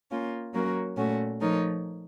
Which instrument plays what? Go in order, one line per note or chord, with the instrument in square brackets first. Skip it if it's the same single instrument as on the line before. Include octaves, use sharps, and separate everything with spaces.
[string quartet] A#3 C#4 F4
F#3 A#3 C#4 F#4 A#4
A#2 A3 C#4 F#4
F3 A3 D#4 A#4 C#5